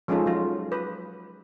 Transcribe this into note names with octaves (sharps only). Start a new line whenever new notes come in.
F3 G#3 C#4 D#4 F4 A4
F#3 F4
B4